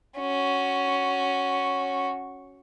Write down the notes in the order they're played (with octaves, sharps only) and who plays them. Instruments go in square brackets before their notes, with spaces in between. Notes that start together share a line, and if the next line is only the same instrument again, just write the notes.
[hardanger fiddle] C#4 F#4